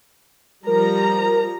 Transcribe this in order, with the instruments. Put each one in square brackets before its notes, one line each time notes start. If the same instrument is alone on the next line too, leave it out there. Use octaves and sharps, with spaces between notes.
[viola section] F3 G3 A#5 [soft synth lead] A#4